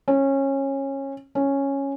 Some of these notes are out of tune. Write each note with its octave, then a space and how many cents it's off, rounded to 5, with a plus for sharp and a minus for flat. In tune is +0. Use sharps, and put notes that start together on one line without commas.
C#4 -20
C#4 -5